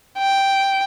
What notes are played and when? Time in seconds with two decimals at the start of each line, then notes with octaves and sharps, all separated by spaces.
0.18 G5